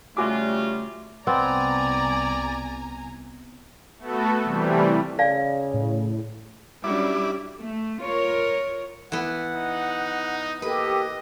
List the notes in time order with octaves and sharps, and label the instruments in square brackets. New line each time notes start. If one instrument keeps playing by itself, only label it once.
[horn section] C#3 G3 F4 [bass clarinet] A3 [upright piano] F#4 G#5 D6
[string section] C2 G#5 A#5 [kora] B3 C4 [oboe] D5
[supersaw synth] A3 B3 F#4 A4
C3 E3 G3 A3
[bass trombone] C#3 [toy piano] D5 F5 G#5
[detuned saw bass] A2
[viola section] F#3 G3 [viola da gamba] C#4 D4 [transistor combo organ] E4 D6
[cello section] A3
F4 A#4 C#5
[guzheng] E3 B3 [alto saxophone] F#5
[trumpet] D#4
[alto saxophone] A#3 [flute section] G4 A4 [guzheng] B4 [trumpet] D#5